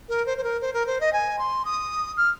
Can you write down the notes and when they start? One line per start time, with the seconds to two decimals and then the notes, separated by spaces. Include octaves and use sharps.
0.09 A#4
0.26 C5
0.38 C5
0.44 A#4
0.61 C5
0.73 A#4
0.87 C5
1.00 D#5
1.13 G#5
1.39 C6
1.65 D#6
2.17 F6